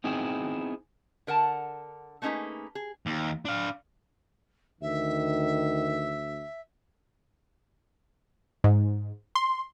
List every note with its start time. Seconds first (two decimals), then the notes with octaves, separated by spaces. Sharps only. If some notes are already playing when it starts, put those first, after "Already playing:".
0.04 B3 C4 D#4 E4 G#4
1.27 D3 A#4 F#5 A5
2.22 A3 A#3 C#4 D#4 G#4 B4
2.75 G#4
3.06 D#2
3.45 D4 F5
4.81 D2 D#3 E5
8.64 G#2
9.35 C6